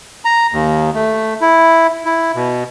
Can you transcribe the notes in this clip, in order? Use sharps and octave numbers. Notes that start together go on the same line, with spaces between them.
A#5
D#2
A3
E4
E4
B2